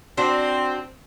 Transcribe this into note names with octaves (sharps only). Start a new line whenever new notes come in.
C4 D4 F#4 C5